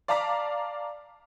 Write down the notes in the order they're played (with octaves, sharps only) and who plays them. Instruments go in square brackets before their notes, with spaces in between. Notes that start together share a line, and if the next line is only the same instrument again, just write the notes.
[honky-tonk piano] D5 F5 A5 A#5 D6 B6